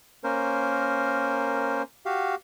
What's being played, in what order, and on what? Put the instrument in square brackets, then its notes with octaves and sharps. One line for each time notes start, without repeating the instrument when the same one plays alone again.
[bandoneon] A#3 C#4 A#4 C5
F#4 G4 F5